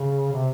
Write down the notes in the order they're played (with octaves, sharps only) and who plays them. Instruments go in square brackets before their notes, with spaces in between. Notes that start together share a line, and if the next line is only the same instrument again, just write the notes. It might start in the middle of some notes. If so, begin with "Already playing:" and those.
Already playing: [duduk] C#3
C3